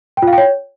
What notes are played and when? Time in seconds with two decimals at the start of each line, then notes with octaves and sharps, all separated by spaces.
0.17 G5
0.22 F4
0.28 F5
0.33 G5
0.38 C#5